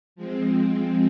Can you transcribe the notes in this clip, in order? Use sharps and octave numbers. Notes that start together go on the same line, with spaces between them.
F3 G#3 C4